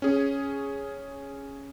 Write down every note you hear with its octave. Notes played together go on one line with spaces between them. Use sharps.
C#4 G#4